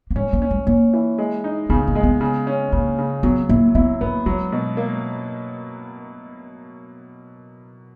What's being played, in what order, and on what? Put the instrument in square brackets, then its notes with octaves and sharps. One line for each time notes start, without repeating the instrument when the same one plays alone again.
[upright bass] A#3
[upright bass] G#3 [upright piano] C#4
[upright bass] A#3
[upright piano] C#4
[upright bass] G#3
[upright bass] A#3 [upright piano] C#4
[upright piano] E3
G#3
D#4
[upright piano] C#3 [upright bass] B3
[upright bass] A#3
[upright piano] G#3
[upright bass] B3
[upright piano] C#3
C#4
[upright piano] C#3 [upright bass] A#3
[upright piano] C#3
[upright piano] F#3 [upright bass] B3
[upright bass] A#3 [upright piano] E4
[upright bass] B3 [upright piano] E4
[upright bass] A#3 [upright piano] B3
[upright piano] F#3 [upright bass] G#3
[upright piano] B2
A#3